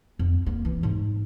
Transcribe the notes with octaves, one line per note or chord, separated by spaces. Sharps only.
F2
A#3
E3
G#2